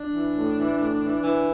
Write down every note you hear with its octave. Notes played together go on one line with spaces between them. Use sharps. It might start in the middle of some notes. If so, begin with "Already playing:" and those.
Already playing: D4
E3
A2
E3
A2
E3
E3